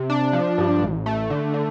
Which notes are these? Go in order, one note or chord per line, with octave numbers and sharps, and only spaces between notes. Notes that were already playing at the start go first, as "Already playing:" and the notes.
Already playing: C3
D4
F3
G2
A1
A3
D3
D3